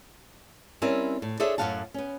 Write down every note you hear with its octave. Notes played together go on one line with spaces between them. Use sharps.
G3 C4 C#4 E4 A#4
A2
D4 G#4 A4 C5 C#5 E5
F#2 A2 F3 F5 F#5 A5
B3 C#4